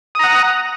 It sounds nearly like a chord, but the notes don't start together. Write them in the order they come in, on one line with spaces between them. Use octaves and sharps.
D#6 A#5 F#5